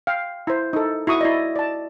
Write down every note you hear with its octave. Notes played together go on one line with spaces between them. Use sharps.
F5 G5
E4 C5
D#4 A4
E4 F#4 C#6 D#6
E4 D5 D#5
D5 A5